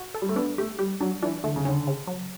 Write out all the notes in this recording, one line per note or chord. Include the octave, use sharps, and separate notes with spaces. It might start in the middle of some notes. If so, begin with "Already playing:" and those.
Already playing: F#4
A4
G3
A3
B3 D4
A3 G4
G3 G4
F#3 D4
E3 D4
D3 A3
C#3
D3 C#4
C#3
F#3